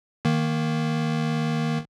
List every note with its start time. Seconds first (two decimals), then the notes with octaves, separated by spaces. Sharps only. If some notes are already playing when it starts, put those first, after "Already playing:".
0.25 D#3 A#3